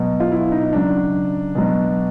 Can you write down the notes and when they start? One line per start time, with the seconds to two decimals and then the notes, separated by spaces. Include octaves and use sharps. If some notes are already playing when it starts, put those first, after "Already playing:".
Already playing: B2 F#3
0.20 F4
0.32 E4
0.52 D#4
0.72 C#3 F#3 D4
1.55 B2 F#3